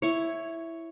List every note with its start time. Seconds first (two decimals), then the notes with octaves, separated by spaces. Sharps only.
0.02 E4 C#5